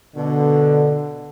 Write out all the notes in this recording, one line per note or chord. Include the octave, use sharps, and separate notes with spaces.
B2 D3